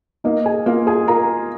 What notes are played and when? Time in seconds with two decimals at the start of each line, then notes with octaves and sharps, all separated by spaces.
0.24 A#3 D#4 D#5
0.46 G#4 G#5
0.66 A#3 F4 F5
0.87 G#4 G#5
1.08 F4 A#4 A#5